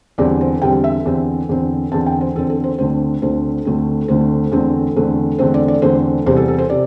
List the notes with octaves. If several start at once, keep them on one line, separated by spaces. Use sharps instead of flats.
E2 D3 G3 C4 D5
C5
E2 D3 G3 C4 G5
E5
E2 D3 C4
E2 D3 C4
E2 D3 C4 A5
G5
C5
E2 D3 C4 A4
A4
C5
D2 D3 A3 C4 C5
D2 D3 A3 C4 C5
D2 D3 A3 C4
D2 D3 A3 C4 C5
E2 D3 A3 C4
E2 D3 A3 C4
E2 D3 A3 C4 C5
D5
D5
E2 D3 A3 C4 C5
E2 C3 G3 C5
A4
A4
C5
C3 D5